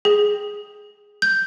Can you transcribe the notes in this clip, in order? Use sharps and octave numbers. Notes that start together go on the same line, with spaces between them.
G#4
G6